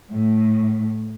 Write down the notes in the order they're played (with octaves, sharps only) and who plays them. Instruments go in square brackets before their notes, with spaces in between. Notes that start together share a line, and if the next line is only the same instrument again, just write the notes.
[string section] A2